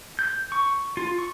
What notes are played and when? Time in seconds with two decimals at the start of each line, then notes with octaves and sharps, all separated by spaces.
0.19 G6
0.52 C#6
0.97 F4
1.18 C#6